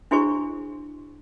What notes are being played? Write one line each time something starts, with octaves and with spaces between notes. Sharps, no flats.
D4 E4 F#4 G#4 C5 C#6